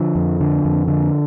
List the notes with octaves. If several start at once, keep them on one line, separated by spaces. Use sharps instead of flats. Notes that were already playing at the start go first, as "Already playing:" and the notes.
Already playing: D3 F3
F2
D3
F2
D3